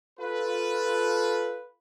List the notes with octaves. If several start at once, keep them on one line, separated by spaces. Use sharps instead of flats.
F4 A4 B4